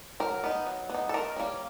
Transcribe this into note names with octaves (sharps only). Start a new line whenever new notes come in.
F#3 A#4
B3 D#4
F#3
B3
D#4
A4
D#3 A#4
G3 A#3 C#4